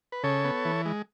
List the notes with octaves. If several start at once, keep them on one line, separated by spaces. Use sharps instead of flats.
B4
C#3 A4 C#5
B3
E3
G#3